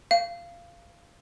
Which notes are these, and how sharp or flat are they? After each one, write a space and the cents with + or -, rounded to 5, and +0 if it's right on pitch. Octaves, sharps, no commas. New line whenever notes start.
F5 -15